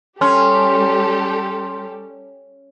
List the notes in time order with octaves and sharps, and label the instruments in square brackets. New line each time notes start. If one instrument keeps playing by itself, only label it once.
[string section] G3 G4 A4 [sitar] C#4 [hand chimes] C6 F6